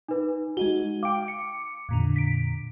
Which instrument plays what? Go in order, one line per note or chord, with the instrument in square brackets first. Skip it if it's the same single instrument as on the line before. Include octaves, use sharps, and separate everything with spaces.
[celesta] D#4 B4
[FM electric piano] G#3 D#4 F#4 [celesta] G7
[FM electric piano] F5 G5 [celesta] D6 D7
[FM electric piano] C#7
F2 A#2 D3
[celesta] B6 D7